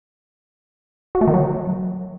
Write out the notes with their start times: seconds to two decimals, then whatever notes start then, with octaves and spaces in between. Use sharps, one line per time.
1.15 F#4
1.21 A3
1.27 D#3
1.34 F#3